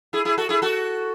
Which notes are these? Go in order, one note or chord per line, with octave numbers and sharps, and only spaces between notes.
E4 G#4
E4 G#4
F#4 A4
E4 G#4
F#4 A4